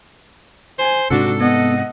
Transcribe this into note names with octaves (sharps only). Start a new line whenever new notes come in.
C5 G#5
G#2 C3 D4 F#4 A4
B3 D#5 F#5